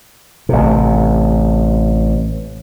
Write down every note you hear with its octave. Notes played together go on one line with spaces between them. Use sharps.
A1 C3